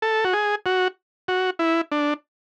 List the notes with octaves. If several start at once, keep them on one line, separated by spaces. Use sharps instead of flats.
A4
F#4
G#4
F#4
F#4
E4
D4